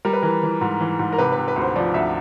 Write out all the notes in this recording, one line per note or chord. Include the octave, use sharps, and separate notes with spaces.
G3 A#4
B4
E3 A#4
E3
G#2
E3
G#2
A#4
C3 B4
B4
C3
B4
D2
C5
F3 D5
D2 E5